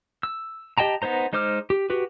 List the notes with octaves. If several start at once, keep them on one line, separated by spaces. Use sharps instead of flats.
E6
G4 D#5 G5 A5 A#5
B3 D#4 C5 A#5
G#3 D#4 C5 D6 F6
G4
F#4 G4 B4